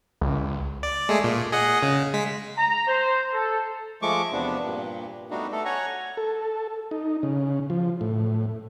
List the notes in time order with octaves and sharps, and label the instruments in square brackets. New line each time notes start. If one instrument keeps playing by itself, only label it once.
[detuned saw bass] C#2
[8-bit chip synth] D5
G#3 A3 G#4
A#2
G#4 D#5 F#5
C#3
G#3 B6
[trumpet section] A#5
C5
A4
[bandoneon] F3 G#3 A3 C#6 D6
E2 C3 F3 B3 D4
G2 A#2
G3 A3 B3 D4 D#4 F#4
A3 A4
C#5 F#5 G#5 A#5 C#6
[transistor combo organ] A4
D#4
C#3
F3
A2